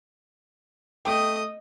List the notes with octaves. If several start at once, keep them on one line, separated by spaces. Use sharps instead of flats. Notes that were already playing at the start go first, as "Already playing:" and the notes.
A3 D#5 G5 D#6